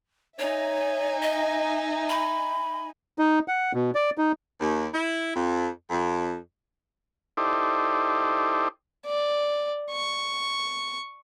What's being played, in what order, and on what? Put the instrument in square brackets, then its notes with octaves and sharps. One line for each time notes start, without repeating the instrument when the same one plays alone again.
[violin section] D#4 E5 G#5 [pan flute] C#5
[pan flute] D#5
B5
[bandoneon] D#4
F#5
B2
D5
D#4
[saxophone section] D#2
E4
F2
F2
[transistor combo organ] D#4 E4 G4 A4 C5 D5
[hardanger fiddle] D5
C#6